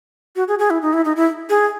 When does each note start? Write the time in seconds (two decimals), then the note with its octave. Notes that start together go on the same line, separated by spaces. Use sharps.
0.36 F#4
0.48 G#4
0.59 G#4
0.70 E4
0.82 D#4
0.93 E4
1.05 D#4
1.16 E4
1.50 G#4